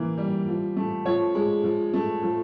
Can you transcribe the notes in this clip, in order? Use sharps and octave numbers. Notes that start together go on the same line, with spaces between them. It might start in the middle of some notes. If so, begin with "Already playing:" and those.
Already playing: E3 A#3
G3
F3
A3
F3 C#5
G#3
F3
A3
F3